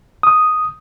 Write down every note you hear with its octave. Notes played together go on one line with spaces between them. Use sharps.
D#6